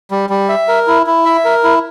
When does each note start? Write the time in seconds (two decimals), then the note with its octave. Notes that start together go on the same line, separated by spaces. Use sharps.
0.11 G3
0.30 G3
0.49 E5
0.68 A#4
0.87 E4
1.06 E4
1.25 E5
1.45 A#4
1.64 E4